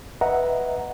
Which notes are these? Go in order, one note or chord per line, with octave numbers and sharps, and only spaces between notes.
B4 D#5 E5 F#5 A#5